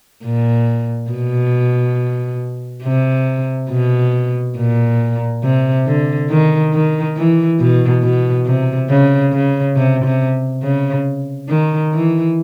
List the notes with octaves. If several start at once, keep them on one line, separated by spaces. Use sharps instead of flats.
A#2
B2
C3
B2
A#2
C3
D3
D#3
D#3
E3
B2
B2
C3
C#3
C#3
C3
C3
C#3
D#3
E3